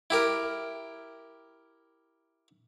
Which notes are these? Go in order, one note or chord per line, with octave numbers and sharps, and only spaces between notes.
E4 G4 A#4